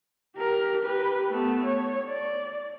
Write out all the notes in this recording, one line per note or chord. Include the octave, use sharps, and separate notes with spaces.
G4 A#4
G4 B4
A3 B3
C#5
D5